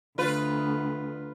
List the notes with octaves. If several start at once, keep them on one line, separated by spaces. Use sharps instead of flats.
D2 F4 B4